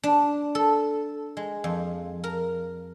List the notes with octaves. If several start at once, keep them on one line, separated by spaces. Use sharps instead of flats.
D4
A4
G#3
F2
A#4